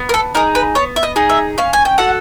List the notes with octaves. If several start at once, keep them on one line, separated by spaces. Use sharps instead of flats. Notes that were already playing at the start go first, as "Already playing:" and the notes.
Already playing: B3
A#4
A4
D#4 G#4 A#4
B4
B3 C#5
E5
D#5
D#4 G#4
E5
C#4 F5
G#5
G5
F#4 A4 F#5